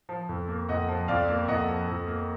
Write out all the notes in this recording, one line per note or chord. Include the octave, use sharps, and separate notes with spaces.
F3
F2
A#3
F2 D#5 F#5
F3
F2 D5 F5
A#3
F2 D#5 F#5
F3
F2
A#3